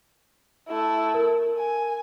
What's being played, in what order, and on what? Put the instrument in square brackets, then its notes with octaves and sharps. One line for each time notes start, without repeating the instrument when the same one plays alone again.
[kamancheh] A3 E4
[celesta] A#4
[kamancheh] G#5